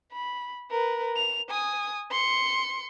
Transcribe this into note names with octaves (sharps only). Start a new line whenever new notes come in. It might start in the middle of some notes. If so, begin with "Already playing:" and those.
B5
A#4 B4
F7
G#5 D#6
C6 C#7